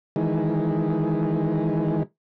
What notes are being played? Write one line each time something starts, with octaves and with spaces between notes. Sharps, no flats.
D#3 E3 G#3